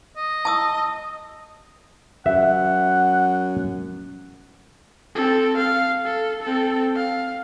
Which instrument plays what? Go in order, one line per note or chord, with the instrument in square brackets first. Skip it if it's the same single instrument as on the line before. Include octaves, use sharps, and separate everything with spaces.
[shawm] D#5
[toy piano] A5 D#6 E6
[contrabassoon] F#2 [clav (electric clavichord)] E5 [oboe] F#5
[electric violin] C4 A4
F5
A4
C4 A4
F5